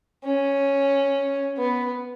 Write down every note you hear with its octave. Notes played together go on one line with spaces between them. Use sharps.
C#4
B3